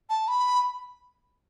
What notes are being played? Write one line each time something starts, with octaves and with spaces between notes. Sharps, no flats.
A5
B5